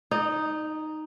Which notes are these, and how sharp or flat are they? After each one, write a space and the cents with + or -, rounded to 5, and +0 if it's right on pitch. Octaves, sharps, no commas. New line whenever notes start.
D#4 +0 D#5 -40